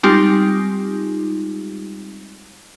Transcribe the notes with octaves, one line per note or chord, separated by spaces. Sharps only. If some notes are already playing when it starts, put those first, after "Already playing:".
G3 G#3 C4 D#4 F4 G4